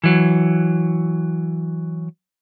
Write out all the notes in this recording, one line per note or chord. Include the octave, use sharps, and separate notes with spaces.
E3 F#3